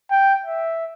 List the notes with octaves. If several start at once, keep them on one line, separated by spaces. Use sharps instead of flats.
G5
E5